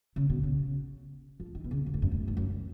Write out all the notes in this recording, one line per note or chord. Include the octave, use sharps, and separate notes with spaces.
C#3
B2
C#3
F3
D#3
B2
C#3
F#2
G#2
F#2
G#2
F#2
G#2
F#2